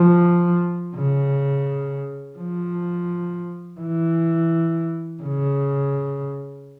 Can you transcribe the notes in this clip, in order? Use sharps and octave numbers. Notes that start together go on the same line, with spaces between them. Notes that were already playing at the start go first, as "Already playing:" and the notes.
Already playing: F3
C#3
F3
E3
C#3